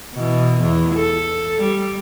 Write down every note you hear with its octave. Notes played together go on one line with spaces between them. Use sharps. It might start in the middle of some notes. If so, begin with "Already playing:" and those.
B2 E3
E2 E3
A4
G3